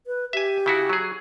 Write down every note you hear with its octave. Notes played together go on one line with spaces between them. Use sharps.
B4
G4 E5 G#5
C#3 E4 F#4
F#3 G#4